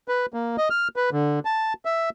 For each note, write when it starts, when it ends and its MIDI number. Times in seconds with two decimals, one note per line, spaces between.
0.08 0.26 71
0.34 0.56 58
0.58 0.69 75
0.70 0.88 89
0.96 1.10 71
1.12 1.39 50
1.45 1.73 81
1.85 2.10 76